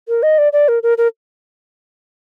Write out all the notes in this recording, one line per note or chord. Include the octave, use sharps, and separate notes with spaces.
A#4
D#5
D5
D5
A#4
A#4
A#4